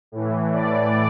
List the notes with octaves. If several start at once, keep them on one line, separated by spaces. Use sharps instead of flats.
A2 E3
D5